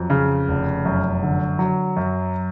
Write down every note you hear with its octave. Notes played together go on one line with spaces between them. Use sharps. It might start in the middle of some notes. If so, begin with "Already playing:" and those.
Already playing: F2 F#3
C#3
F1
F#2
D3
F#3
F#2